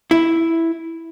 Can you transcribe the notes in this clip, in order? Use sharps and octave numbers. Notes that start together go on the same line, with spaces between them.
E4